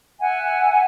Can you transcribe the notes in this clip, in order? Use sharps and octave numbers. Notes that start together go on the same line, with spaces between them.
E5 F#5 G#5